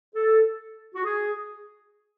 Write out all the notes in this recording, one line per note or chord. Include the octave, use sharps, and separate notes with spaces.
A4
F#4
G#4